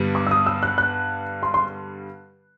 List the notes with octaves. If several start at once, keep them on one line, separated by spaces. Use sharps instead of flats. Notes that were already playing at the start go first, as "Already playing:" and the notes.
Already playing: G2 D3 G3 B3
D6
E6
D#6
E6
F#6
F#6
C6
C6